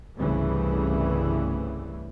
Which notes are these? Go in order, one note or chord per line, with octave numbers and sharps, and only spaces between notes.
C2 G2 C#3 E3 G3 A3